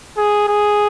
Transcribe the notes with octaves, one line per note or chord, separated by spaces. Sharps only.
G#4
G#4